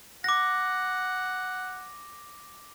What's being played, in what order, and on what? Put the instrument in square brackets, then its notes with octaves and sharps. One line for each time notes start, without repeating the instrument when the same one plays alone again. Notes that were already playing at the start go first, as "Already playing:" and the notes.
[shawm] F#5 [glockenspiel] D6 A#6